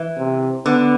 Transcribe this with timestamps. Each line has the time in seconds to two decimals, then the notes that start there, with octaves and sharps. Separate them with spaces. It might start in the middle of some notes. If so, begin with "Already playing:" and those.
Already playing: E3
0.18 C3
0.66 D3 B3